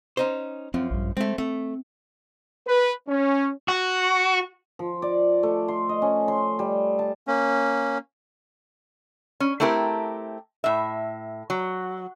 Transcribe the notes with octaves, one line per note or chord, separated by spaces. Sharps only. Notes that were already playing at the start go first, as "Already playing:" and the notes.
C#4 D#4 C5
F#2 F3 C4
A#1 G2
G#3 A3 C4
A3 C4
B4
C#4
F#4
F3
D5
A3
C6
D#5
C#4
C6
G3
A5
A#3 C#4
C#4
A3 C4 E4 G4 A#4
A2 E5
F#3